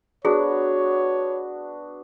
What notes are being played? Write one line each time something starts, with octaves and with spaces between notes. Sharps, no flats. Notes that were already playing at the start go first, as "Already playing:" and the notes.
B3 D4 F#4 G#4 C#5